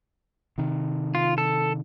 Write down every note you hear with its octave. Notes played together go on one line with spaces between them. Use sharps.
C3 D#3
F4
A4